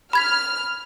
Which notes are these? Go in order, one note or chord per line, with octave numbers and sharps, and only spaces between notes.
B5 F6 G#6 B6